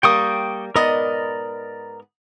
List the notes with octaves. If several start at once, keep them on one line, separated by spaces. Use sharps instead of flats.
G3 A#3 G5 C#6 D#6
G#2 B3 A#4 D5 D#5